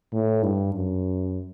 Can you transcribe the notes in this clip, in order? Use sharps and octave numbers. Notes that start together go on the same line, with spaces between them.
A2
G2
F#2